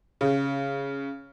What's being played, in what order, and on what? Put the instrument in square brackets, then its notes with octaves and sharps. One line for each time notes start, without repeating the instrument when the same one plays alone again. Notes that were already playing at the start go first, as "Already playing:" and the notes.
[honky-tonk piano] C#3